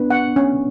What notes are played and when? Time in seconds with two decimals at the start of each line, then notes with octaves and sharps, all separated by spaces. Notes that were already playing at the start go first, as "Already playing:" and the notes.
Already playing: B3 D4 B4
0.10 F#5
0.36 C#4